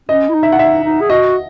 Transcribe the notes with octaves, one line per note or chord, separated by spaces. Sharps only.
C#4 D#5
E4
D#4
E5
F#5
D#4 E5
D#4
G#4
F#4 D#5